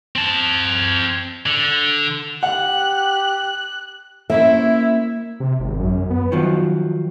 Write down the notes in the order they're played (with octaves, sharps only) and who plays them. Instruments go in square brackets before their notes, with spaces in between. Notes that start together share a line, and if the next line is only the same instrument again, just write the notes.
[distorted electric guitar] C4 A5
D3
[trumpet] G4 [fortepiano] F#5 [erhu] F#6
[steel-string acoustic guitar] A#3 C#4 C5 [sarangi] E4 [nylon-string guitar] E5
[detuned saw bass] C3
G#1
F#2
B3
[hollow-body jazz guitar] D#3 F3 F#3